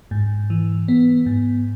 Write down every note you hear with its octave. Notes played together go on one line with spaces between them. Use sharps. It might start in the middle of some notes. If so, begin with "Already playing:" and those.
G#2
E3
B3
G#2